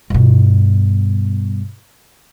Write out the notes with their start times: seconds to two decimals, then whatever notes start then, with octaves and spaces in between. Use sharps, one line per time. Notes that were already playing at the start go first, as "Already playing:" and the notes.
0.10 G2 B2